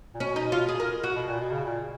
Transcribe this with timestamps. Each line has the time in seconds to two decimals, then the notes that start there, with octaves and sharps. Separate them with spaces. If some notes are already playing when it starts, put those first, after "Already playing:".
0.15 A#2
0.20 B2 C#4
0.36 D#4
0.52 F4
0.69 G#4
0.80 A#4
1.04 F#4
1.16 B2
1.28 A#2
1.40 B2
1.51 C#3
1.64 A#2